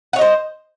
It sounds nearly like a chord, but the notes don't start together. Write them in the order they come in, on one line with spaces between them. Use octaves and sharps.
F#5 C#5 D#5 C5